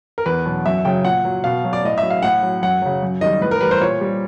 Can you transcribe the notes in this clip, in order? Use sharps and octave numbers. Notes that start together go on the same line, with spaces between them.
A#4
E2 B4
B2 F#3
F#2 E5
C#3 F#3 G5
A#2 F#5
F#3
B2 F5
F#3
D5
A2 D#5
E5
F#3
F5
A2 F#5
F#3
F#2 F#5
C#3 F#3
F#2
D#3 G3 D#5
A2 B4
A#4
E3 G3 B4
C5
A#2 C#5
G3